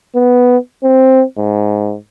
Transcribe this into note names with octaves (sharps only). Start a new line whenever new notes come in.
B3
C4
G#2